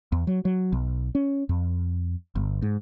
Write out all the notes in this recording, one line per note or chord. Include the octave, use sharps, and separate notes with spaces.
E2
F#3
F#3
B1
C#4
F2
G1
G#2